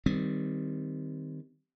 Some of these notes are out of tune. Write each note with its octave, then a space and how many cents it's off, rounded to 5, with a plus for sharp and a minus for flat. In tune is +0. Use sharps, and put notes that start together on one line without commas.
D#3 +0 G3 +0 C4 -20